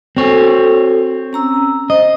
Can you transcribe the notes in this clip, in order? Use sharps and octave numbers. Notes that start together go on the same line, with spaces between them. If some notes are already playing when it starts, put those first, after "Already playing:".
C4 F#4 A4 C#5
C#4 A#5 E6
C5 D#5